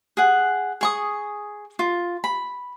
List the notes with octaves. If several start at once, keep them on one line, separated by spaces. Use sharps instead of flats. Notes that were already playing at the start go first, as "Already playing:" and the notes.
G#4 F#5
G#4 C#6 D#6
F4
B5